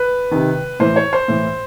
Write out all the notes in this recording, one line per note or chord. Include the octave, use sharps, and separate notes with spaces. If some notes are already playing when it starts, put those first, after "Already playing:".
Already playing: B4
C3 D#3
A2 E3 C5
C#5
C5
A2 E3